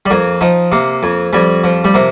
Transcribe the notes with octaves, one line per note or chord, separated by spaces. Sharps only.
G3
F2 A#3
F3 D#4
C3 A#3
F2
F2 G3
F3
G3
C3 A#3